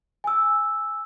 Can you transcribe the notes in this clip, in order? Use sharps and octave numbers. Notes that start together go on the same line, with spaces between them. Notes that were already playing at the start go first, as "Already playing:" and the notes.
G#5 E6